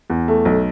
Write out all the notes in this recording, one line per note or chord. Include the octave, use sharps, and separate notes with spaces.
E2
A3
B1